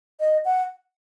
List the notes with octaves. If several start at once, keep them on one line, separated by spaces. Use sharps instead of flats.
D#5
F#5